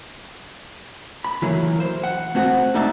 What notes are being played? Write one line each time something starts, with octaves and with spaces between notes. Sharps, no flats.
B5
E3 F#3 A3 A#3 E4
C5
F#5
A3 C4 F#4 F#5
A3 D#4 D5 E5 F#5 A5